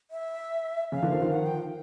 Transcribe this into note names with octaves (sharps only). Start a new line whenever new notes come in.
E5
C#3 F5
D3 E3
D#3 F3
D#3 F3
F#5
G5